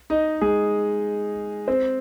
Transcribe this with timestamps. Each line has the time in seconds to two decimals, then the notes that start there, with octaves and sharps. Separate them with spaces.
0.10 D#4 D#5
0.42 G#3 G#4
1.68 C4 C5